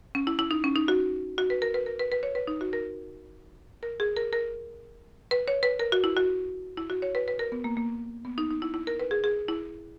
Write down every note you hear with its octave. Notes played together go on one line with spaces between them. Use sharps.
C#4
E4
E4
D#4
C#4
D#4
F#4
F#4
B4
A#4
B4
A#4
B4
B4
C#5
B4
D#4
F#4
A#4
A#4
G#4
A#4
A#4
B4
C#5
B4
A#4
F#4
E4
F#4
E4
F#4
C#5
B4
B4
A#4
B3
A#3
A#3
B3
D#4
D#4
E4
E4
A#4
B4
G#4
G#4
E4